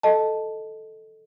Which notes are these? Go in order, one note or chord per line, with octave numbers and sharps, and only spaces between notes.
A4 D#5 A5